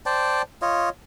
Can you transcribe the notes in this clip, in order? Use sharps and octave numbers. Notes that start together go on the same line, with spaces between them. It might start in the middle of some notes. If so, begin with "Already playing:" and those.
C5 D5 G5 A5
F4 C#5 D#5